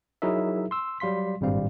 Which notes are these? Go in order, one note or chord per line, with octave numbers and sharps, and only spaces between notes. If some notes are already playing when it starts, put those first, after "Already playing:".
F#3 D#4 E4 G#4 A#4 E5
C6 E6
F#3 G3 F5 C6 B6
G#1 G2 A#2 G3 C4 F5